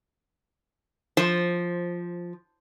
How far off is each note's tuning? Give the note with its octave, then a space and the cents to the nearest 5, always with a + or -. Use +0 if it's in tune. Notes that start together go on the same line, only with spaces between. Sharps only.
F3 +0 C5 +10